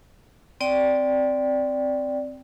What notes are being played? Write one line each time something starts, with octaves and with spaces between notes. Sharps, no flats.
C4 D5 G5